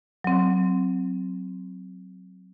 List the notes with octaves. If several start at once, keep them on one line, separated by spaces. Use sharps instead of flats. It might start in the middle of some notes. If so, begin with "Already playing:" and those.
F#3 C4